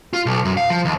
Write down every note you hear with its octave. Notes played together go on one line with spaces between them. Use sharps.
F4
B1
F#2
F5
F3
D#2